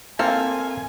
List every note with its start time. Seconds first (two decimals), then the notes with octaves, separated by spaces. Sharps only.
0.19 A#3 C4 A4 F5 G#5